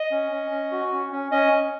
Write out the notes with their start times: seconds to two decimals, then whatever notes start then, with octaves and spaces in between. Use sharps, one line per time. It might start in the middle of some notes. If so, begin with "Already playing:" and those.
Already playing: D#5
0.11 C#4
0.32 C#4
0.51 C#4
0.71 F#4
0.92 C#4
1.12 C#4
1.32 C#4 D#5
1.53 C#4